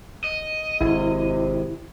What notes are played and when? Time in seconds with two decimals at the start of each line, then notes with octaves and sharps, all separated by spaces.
0.24 D#5
0.81 G#1 C3 E4